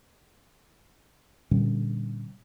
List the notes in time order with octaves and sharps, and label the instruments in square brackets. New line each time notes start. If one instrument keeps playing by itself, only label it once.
[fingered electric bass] A#2 D3 G3 C#4